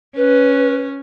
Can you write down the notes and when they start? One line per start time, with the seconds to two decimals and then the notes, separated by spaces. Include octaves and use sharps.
0.16 C#4 B4